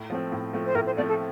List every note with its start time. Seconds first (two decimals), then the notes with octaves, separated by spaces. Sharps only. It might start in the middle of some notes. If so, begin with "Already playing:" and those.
Already playing: A2
0.10 F3 A3 C4
0.32 A2
0.53 F3 A3 C4
0.65 C5
0.75 A2 A#4
0.86 C5
0.97 F3 A3 C4 D5
1.08 A4